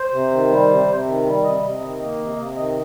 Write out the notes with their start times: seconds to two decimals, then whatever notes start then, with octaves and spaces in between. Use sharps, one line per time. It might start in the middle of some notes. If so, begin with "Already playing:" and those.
Already playing: C5
0.11 C3
0.31 D#3
0.49 G3
0.68 C3
0.87 C3
1.05 D#3
1.25 G3
1.43 C3 D#5
1.62 C3
1.81 D#3
1.99 A#3 D#5
2.18 C3
2.36 C3
2.56 D#3 D#5